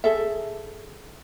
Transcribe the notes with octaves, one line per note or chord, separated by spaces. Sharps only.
G#4 A4 E5